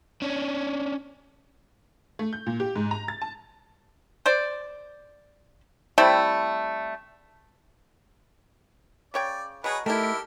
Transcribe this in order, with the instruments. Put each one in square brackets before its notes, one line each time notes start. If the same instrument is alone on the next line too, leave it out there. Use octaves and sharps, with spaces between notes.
[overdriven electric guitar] C#4 D4
[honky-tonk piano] A3
G6
A#2
G4
G#2
A#5
A6
A5
[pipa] C5 D5
G3 A3 C4 E4
[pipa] C#3 C#5 G5 [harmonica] D5
[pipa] B2 A#5 [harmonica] G#4 B4 C#5
[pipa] D#3 E4 [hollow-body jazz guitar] A3 [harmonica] G4 A4 A#4